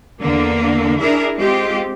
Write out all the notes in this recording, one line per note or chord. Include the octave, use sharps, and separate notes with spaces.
E2 D3 A#3
D4 E4 G#4 A#4
G#3 C4 F4 G4